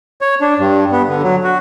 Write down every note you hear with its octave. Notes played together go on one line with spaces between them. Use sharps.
C#5
D4
G2
B3
D3
F#3
F#4